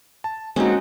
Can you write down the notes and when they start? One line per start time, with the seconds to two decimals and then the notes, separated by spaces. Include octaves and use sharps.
0.24 A5
0.56 G#3 A#3 C4 C#4 D#4 F#4